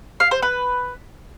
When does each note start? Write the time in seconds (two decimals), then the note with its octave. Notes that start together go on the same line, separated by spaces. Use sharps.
0.20 F5
0.31 C5
0.42 B4